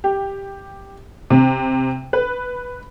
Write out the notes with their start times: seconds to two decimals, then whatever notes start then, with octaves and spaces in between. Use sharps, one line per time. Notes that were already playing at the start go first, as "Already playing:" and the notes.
0.04 G4
1.30 C3
2.13 B4